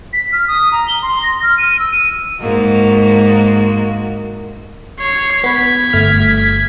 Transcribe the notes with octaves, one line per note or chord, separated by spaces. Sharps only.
B6
F6
D#6
A#5
G7
C6
A#6
F6
D#7
E6
D#7
G#2 A#3 F#4
C#5 C7
B3 B4 G#6 B6
G1 A3 F6